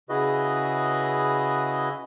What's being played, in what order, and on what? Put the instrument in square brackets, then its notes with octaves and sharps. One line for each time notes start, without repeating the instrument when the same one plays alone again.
[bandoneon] C#3 E4 F#4 G#4 B4 D#5